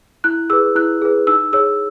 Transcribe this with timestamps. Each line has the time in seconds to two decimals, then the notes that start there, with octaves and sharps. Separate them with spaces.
0.24 E4 F#6
0.50 G#4 B4 E6
0.75 E4 F#6
1.02 G#4 B4
1.27 D#4 E6
1.53 G#4 C#5 E6